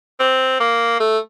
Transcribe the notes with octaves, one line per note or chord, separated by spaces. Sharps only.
C4
A#3
A3